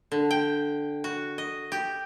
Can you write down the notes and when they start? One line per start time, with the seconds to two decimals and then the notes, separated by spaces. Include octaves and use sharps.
0.12 D3
0.31 G5
1.04 F#4
1.38 D#5
1.72 G4